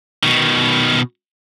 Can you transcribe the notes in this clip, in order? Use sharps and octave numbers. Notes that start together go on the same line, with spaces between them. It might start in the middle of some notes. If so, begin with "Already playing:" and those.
B2 D#3